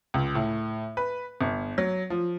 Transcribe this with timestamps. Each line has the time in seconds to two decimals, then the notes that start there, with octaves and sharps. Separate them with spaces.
0.14 C#2
0.35 A2
0.97 B4
1.41 G1
1.78 F#3
2.10 F3